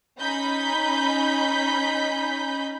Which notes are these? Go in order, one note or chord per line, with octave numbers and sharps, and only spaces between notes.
C#4 D#4 B5 G6 B6